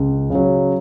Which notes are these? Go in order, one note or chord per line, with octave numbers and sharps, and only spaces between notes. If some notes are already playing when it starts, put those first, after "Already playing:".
Already playing: C#2
C#3
F#3